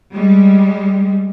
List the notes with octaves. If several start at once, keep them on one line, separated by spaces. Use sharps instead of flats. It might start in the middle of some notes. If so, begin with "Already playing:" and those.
G3 G#3